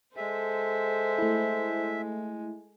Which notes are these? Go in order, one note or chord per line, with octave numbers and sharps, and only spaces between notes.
G#3 A4 C5 E5
A3 E4